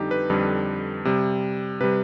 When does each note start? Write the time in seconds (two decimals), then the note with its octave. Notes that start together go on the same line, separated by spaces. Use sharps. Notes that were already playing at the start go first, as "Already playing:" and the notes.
Already playing: F2 D3 G3 D#4 G4
0.11 B4
0.30 F2 D3 G3
1.05 C3 G3
1.81 C3 G3 B4